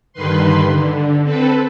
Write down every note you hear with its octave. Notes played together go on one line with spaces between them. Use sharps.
G2 D3 D#3 B4 C6
D3
C4 A4 B4